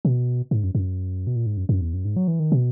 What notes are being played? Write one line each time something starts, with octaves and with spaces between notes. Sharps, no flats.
B2
G#2
F#2
F#2
B2
A#2
G#2
F#2
F#2
E2
F#2
G#2
F#3
E3
D#3
B2